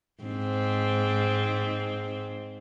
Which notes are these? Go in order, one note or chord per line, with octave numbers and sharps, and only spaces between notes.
G#2 C4